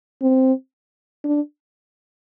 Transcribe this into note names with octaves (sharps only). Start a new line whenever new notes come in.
C4
D4